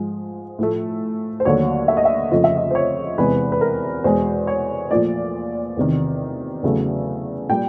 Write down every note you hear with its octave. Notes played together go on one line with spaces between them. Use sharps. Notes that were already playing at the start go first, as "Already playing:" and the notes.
Already playing: G#2 F3 G#3
A2 F3 A3
C5
D#2 D3 F#3 A3 C#5
E5
D#5
E5
F2 C#3 F3 A3 D#5
E5
D#5
C5
C#5
E2 C3 E3 G#3 B4
B4
A#4
E2 B2 G#3 C5
C#5
A#2 F3 A3 D5
E2 C3 D#3
E2 C#3 F#3 A3
A#2 G3 G5